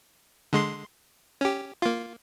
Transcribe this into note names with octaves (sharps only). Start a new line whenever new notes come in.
D3 G#3 C6
C#4 G4
A#3 F4